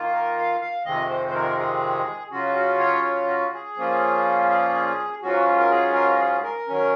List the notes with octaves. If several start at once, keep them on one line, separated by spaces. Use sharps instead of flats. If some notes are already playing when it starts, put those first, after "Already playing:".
Already playing: D#3 A#3 F4
A#4
F5
F5
F2 C3 D#3 G#3 C4 D#5
C5
C5
A#4
G#4
C#3 F#3 C#4 F4 F#4
F#4
C#5
C#5
F#4
G#4
A#2 F3 A#3 C#4 F4
G#4
G#2 F#3 C#4 F4 F#4
A#4
G#4
A#4
G#4
A#4
D#3 F#3 C#4